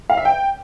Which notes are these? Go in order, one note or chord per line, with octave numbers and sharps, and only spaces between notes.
F5
E5
G5